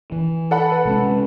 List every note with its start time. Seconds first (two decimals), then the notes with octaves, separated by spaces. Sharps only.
0.12 E3
0.51 A4 F#5 B5
0.72 B4
0.85 C3 G#3 C#4